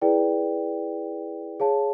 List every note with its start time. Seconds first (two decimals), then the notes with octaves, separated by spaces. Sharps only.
0.02 E4 G#4 B4 D5 G5
1.60 G#4 C#5 F5 A5